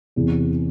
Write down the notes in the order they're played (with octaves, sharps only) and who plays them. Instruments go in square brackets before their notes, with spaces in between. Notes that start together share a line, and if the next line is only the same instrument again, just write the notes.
[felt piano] E2 C3 E3